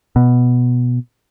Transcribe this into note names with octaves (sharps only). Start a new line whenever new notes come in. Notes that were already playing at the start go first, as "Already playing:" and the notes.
B2